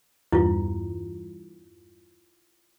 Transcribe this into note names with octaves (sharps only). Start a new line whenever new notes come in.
E2 G2 E4 F4